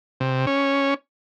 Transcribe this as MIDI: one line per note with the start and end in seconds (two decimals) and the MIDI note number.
0.20 0.46 48
0.47 0.94 61